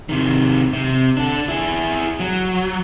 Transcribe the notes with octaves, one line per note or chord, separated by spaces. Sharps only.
C3 D#3
C3
D4 A4
E4 G#4
F#3